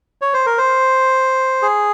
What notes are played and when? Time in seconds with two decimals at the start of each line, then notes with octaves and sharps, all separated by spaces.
0.22 C#5
0.34 C5
0.46 A#4
0.58 C5
1.62 G#4